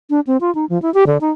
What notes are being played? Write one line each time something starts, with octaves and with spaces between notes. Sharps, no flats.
D4
C4
F4
D#4
F3
E4
G4
D3
D#4